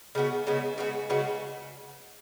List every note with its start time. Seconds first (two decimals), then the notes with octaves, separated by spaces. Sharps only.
0.15 C#3 G#3 B3 F#4
0.47 C#3 G#3 B3 F#4
0.78 C#3 G#3 B3 F#4
1.10 C#3 G#3 B3 F#4